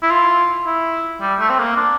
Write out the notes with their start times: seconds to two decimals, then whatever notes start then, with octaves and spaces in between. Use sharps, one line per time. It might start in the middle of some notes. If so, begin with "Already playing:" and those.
0.02 E4
0.11 F4
0.66 E4
1.21 G3
1.39 A3
1.49 C4
1.59 A#3
1.76 D4